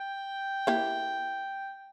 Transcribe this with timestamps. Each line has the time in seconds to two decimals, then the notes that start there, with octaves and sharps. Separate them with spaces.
0.01 G5
0.67 A#3 E4 G4